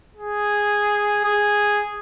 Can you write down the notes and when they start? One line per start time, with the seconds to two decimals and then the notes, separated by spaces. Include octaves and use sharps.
0.16 G#4
1.24 G#4